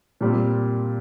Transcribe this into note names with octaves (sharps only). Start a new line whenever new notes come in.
A#2 G3 C4